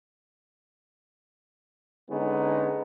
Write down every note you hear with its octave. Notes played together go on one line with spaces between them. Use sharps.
D3 G#3 B3 C#4 D#4